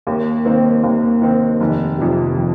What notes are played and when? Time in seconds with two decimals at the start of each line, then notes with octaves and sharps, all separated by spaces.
0.07 D#2 A#3
0.45 D#3 A#3 C4
0.83 D#2 A#3
1.22 D#3 C4
1.60 F1 D#3
1.98 F2 C3 D#3
2.36 F3